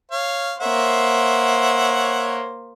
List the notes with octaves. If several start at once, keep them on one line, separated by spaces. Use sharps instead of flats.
C#5 F5
A#3 C5 C#5 E5 F#5